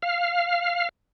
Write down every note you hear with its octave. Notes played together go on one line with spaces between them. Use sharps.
F5